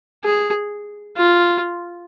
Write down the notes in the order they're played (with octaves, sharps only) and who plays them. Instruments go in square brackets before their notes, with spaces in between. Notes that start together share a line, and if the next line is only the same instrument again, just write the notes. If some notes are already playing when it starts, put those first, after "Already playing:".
[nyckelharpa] G#4
F4